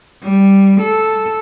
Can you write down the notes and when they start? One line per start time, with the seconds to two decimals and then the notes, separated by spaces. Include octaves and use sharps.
0.23 G3
0.81 A4